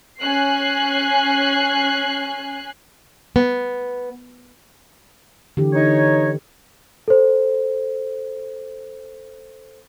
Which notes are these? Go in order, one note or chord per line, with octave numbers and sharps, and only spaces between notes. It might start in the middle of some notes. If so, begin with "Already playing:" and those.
C#4 G#5 F#6 C7
B3
D3 E3 G4
D#4 C#5
A4 C5